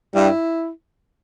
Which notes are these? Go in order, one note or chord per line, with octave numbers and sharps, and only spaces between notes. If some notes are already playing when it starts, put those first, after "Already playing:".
G2 G3 E4